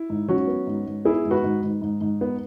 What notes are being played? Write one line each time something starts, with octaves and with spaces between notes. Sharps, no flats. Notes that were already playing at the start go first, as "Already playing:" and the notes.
Already playing: E4
G#2
F#3 C#4 F#4
B3
G#2
G#2
B3 E4 G#4
G#2
F#4 B4
G#2
G#2
G#2
G#2
B3